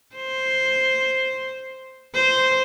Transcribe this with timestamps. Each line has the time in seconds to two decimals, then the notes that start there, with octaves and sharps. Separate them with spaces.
0.15 C5
2.14 C5